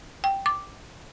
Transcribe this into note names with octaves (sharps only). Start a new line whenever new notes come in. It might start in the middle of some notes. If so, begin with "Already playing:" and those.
G5
D6